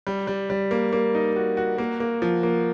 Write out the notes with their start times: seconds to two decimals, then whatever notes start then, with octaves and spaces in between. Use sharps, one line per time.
0.07 G3
0.27 G3
0.50 G3
0.71 A#3
0.93 A#3
1.15 D#4
1.36 F#4
1.57 F#4
1.78 A#3
2.00 A#3
2.22 F3
2.43 A#3